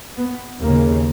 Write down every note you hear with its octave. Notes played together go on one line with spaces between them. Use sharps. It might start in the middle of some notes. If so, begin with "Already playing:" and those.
B3
D#2 C#3 A#3